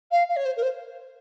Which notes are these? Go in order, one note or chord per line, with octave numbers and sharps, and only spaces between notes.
F5
F5
C#5
C5
A#4
C5